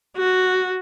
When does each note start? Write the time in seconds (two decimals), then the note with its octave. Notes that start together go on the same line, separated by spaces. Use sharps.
0.17 F#4